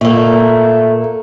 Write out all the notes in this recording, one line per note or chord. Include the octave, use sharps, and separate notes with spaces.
A#2 A3 A#3